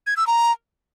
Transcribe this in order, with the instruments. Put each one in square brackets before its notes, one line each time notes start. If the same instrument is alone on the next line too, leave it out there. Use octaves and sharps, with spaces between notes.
[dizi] G#6
E6
A#5